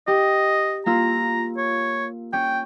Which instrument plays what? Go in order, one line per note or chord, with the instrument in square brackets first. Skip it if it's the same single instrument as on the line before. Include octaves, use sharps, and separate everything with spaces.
[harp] G4 [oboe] D#5
[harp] A#3 F4 E6 [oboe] A#5
[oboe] C#5
[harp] C#4 [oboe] G5